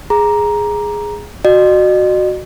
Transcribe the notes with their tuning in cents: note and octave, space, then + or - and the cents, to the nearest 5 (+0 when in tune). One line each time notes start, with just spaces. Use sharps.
G#4 +0 A#5 +10
F#4 +0 D#5 -45